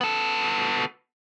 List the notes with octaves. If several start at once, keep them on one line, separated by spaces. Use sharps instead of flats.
B3 A4